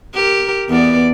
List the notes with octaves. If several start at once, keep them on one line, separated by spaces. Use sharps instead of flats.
G4 A#4
E2 B3 D5